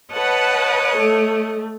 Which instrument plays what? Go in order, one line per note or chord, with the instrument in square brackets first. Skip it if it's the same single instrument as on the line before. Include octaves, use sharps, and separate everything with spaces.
[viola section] B4 F#5 A5 [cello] C#5 D#5
[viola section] A3